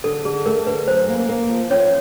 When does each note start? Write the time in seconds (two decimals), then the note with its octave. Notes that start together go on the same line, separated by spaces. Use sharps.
0.04 D3 A4
0.25 D3 G#4
0.46 A3 A#4
0.67 D3 B4
0.88 F#2 C5
1.08 A#3
1.29 A#3
1.49 F3
1.70 F3 C#4 C#5